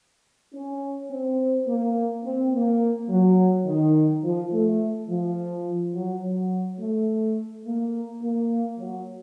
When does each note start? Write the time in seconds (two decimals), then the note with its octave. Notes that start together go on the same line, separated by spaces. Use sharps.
0.53 C#4
1.11 C4
1.67 A#3
2.24 C4
2.53 A#3
3.09 F#3
3.66 D#3
4.24 F3
4.52 A3
5.09 F3
5.94 F#3
6.23 F#3
6.79 A3
7.65 A#3
8.22 A#3
8.78 F#3